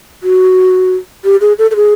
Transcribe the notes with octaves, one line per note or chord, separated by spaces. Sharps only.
F#4
G4
G#4
A4
A4
G#4